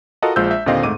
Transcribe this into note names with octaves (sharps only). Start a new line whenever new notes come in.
F4 F#4 A4 A#4 D#5 F#5
A#1 G#3 F4 C5 E6 G6
E5
D#2 A#2 D3 C4 D#5 F5
G#2 A3 D6 D#7